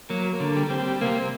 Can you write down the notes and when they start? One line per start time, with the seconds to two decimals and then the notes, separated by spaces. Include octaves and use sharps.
0.09 F#3 A#3
0.33 A#3
0.40 D3
0.56 G3
0.70 C4
0.78 G3
1.01 C3 A#3